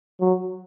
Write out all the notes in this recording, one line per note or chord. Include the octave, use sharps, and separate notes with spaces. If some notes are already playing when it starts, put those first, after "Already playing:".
F#3